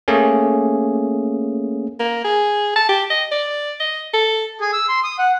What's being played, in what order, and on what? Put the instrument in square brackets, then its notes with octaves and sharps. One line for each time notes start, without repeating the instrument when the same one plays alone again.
[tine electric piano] A3 A#3 C#4 G#4
[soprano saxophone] A#3
G#4
A5
G4
D#5
D5
D#5
A4
[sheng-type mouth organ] G#4
E6
C6
D#6
F#5